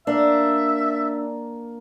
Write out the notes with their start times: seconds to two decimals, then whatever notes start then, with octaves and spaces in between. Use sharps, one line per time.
0.07 A#3 D4 E5